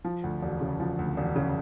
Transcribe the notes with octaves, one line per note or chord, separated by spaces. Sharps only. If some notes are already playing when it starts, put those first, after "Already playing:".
F3
D2
E1
C#3
F3
D2
E1
C#3